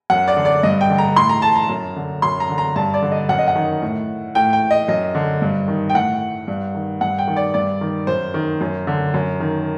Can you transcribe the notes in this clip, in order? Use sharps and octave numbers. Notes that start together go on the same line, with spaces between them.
F#2 F#5
D5
D3
D5
G2 D#5
G5
D3
A#5
A2 C6
A#5
A5
A#5
F#2
D3
F#2 C6
A#5
D3
A#5
G2 A5
D5
D3
D#5
F#2 F#5
D#5
F#5
D#3
A2
A2 G5
G5
D#5
F#2 D#5
D3
G2
D#3
G5
A2 F#5
G2
D#3
G2 F#5
G5
D#3
D5
G2 D5
D#3
F#2 C5
D#3
F#2
D3
F#2
D#3